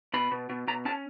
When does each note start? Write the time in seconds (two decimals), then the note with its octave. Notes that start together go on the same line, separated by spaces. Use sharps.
0.14 B2 B5
0.32 B2
0.49 B2
0.67 B2 A#5
0.85 C#4 A5